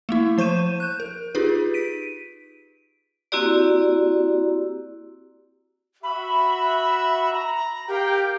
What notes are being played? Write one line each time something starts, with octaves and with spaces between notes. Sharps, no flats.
A3 A#3 E4
F3 C5 C#6 G6 D#7 E7
F#6 G6
A#4
D#4 F4 G4 G#4 B4
B6 D7 D#7
A#3 C4 E4 F#4 G4 D5
F#4 E5 B5
A#5
G4 A#4 F5 G5